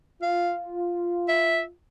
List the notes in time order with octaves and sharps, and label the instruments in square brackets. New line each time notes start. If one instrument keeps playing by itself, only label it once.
[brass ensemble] F4 [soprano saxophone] F5
[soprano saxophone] E5